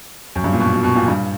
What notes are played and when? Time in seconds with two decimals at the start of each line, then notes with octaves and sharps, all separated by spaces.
0.35 F#2
0.44 G2
0.53 A#2
0.60 B2
0.73 B2
0.83 B2
0.96 A#2
1.08 G2